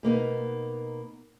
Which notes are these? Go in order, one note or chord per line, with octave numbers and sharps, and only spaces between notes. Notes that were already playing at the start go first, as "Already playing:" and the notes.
B2 A#3 B3 D#4